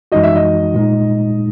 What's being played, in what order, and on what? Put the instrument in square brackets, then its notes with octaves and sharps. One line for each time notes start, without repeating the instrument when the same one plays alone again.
[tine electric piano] F#2 E3 G#3 D#4 F#4 [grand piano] D#5
[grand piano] E5
D#5
[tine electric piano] A#2 G#3 D#4